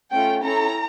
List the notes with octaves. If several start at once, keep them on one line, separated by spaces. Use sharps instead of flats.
A3 C#4 F4 G5
C#4 E4 A4 A#5